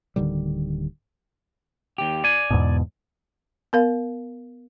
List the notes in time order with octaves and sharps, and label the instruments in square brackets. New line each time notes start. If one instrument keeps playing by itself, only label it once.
[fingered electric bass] D1 D3 D#3 G3
[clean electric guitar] D#2 G4
D5 G#5
[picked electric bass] E2 G#2 B2
[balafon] B3 A#4 F5